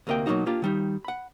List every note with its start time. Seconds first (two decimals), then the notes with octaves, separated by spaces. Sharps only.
0.07 D2 C3 A#3 D#5 G5
0.26 B2 F#3 G3 A#3 D#4 F#4
0.46 A#3 D4 F4 G4
0.62 D#3 G3 D#4
1.05 F#5 B5